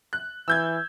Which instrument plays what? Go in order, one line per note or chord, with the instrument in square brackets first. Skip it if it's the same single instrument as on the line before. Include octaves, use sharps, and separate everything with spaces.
[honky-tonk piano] F#6
[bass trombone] E3 [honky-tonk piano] E6 G6 G#6